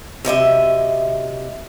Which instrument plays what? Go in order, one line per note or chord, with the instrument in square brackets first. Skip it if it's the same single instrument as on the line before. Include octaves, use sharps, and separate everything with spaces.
[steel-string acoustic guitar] F#2 C3 D#5 E5